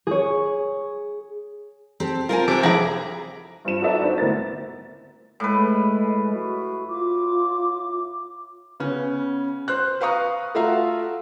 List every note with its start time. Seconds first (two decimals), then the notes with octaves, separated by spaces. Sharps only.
0.07 G#4 C#5
2.00 C4 G4 A4
2.29 A#3 C4 F4 A4 A#4 G#5
2.48 C3 C5 A5 D6
2.63 F3 E4 G#4 A4 A#5 A#6
3.65 G2 C4 F4 E7
3.81 D#4 F#4 A4 B4 D5 E5
4.02 C4 D4 F#4 C5
4.18 D2 A2 B3 C4 A#4 A6
5.40 A2 G#3 B4
6.33 F#4
6.89 F4 D6
8.80 C#3 B3 C#4
9.68 C5 C6 F#6
10.01 B4 F5 A#5 C#6 D#6
10.55 A3 F4 F#4 E5 F5 A#5